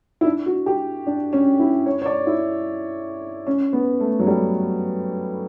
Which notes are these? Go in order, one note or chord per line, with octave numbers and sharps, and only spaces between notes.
E4
D4
F#4
G4
D4
C#4
E4
C#5
C#5
D5
E4
C#4
B3
A3
F#3
G3